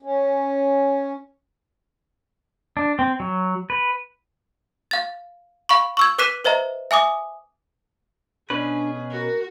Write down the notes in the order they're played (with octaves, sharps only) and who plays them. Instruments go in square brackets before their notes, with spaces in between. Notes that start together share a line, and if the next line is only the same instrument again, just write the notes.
[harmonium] C#4
[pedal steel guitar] D4
C4
F#3
B4
[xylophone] F5 A6
F5 B5 C#6
C#6 E6 G#6
B4 D6 F#6 B6 D#7 E7
B4 C5 D#5 E5 A#5
E5 G#5 D6 D#6
[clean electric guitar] B2 C#4 B4 [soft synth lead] D4 [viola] G#4
[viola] F#4 [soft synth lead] A#4